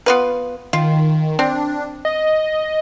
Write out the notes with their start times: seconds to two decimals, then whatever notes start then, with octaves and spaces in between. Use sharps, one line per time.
0.06 B3 F4 B4
0.73 D#3 F4
1.39 C4 D4
2.05 D#5